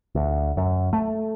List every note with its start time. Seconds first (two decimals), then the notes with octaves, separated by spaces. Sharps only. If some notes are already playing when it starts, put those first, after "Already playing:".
0.15 D2
0.57 F#2
0.93 A3